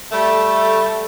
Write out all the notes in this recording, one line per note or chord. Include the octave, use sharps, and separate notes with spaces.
G3 A3